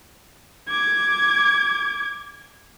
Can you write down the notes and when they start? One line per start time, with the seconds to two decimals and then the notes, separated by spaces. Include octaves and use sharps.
0.68 D6 G#6